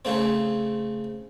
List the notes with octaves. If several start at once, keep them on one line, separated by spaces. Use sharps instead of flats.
C#3 A3 C4